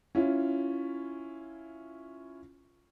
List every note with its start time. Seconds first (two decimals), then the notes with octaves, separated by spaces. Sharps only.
0.15 C#4 E4 F4